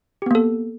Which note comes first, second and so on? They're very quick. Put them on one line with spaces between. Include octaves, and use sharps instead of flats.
G4 B3 A#3 A4